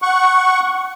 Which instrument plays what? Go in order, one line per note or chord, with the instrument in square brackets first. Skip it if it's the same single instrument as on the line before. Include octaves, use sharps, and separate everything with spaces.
[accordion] F#5 C#6